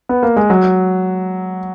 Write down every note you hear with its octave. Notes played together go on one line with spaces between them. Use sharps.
B3
A#3
G#3
F#3